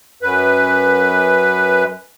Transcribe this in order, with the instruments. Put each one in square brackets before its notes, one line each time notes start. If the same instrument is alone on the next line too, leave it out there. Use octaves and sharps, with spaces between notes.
[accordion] F#2 B4